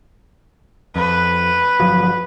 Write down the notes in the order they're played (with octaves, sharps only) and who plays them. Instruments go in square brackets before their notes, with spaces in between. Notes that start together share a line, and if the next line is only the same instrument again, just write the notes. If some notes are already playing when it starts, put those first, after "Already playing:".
[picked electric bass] F2 [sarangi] B4
[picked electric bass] G1 F3 F#3